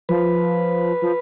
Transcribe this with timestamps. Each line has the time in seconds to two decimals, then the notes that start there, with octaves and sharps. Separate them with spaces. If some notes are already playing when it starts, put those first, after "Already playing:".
0.09 F3 B4
1.02 F3